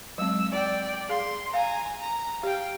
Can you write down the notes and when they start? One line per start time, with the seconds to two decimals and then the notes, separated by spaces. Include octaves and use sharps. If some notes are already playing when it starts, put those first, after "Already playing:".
0.18 F#3 G#3 C4 E6
0.52 D5 G5
1.09 G#4 F5 C6
1.54 F5 G#5 A#5
2.00 A#5
2.43 G4 F5 G5